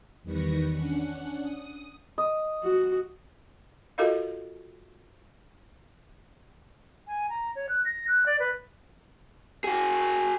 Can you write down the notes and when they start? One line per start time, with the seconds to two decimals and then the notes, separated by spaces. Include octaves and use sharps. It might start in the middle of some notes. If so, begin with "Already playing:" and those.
0.23 E2 D#3 G3 B4 C#6 A#6
0.72 C#4 D4 F#5
1.42 D#6
2.18 D#5
2.64 F#4
3.98 F4 F#4 A4 A#4 D#5 F5
7.07 G#5
7.29 A#5
7.56 C#5
7.69 F#6
7.85 A#6
8.08 F#6
8.26 D5
8.40 B4
9.64 F#4 G#4